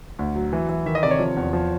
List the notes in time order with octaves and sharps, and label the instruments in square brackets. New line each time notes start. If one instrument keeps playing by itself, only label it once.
[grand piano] D2
F#3
E3
E3
D#3 E5
D#5
C3 D5
C#5
F3
E2
F3